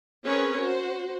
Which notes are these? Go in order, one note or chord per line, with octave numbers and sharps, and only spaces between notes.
C4 C#4 G#4 A#4 B4 C#5
F#4 C5